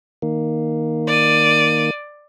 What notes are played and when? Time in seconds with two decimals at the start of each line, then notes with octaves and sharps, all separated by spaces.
0.22 D#3 A#3
1.08 D5 D#7